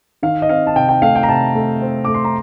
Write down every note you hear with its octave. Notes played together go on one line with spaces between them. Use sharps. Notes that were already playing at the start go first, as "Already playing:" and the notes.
D#3 F5
D#5
C4 F5
A5
C3 G5
G5
A3 F5
G5
A#5
C3 A5
A3
C4
A3 D6
C6
A#5